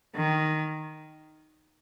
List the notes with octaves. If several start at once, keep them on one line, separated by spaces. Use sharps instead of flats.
D#3